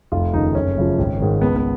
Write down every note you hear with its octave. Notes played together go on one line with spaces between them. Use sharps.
F1 F4
D#2 C#3 F3 D#4
F#1 C#4
F#2 C#3 F3
G#1
G#2 D#3
C#2 B3
B3